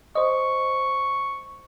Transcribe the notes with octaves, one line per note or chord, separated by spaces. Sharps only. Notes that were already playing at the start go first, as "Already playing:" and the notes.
C5 D#5 C#6